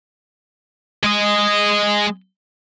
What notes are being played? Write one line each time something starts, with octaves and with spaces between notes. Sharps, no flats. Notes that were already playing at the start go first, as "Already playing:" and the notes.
G#3 D#5